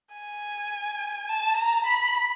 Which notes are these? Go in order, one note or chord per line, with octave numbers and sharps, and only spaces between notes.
G#5
A5
A#5
B5